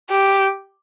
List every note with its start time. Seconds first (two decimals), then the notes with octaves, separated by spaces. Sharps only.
0.11 G4